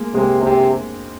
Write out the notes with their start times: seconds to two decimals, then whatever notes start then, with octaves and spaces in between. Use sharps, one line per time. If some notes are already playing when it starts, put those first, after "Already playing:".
Already playing: G#3 A#3
0.14 C3 G#3 A#3
0.43 C3 A#3 C4